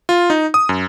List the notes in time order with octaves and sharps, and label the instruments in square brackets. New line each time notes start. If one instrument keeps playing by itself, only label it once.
[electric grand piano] F4
D#4
D#6
F#2